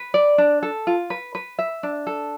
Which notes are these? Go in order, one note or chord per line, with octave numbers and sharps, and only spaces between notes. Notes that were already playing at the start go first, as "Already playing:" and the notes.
Already playing: B4
D5
D4
A4
F4
B4
B4
E5
D4
A4